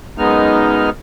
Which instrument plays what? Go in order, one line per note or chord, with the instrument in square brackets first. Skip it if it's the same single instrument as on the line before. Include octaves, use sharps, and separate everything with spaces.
[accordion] F#2 G#3 B3 D#4 F6